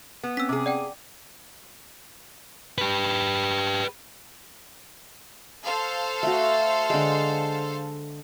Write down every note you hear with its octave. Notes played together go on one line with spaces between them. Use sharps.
B3
C4 C#4 E6 B6
C3 G#4 D6
D5 F#5 G5
G4 B4
A4 C5 F5
A3 F#4
D3 G#3